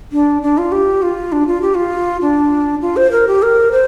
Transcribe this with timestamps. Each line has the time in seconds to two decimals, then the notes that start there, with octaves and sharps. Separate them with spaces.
0.12 D4
0.42 D4
0.58 F4
0.72 G4
1.02 F4
1.32 D4
1.47 F4
1.62 G4
1.75 F4
2.21 D4
2.82 F4
2.97 C5
3.12 A#4
3.28 G4
3.42 A#4
3.72 C5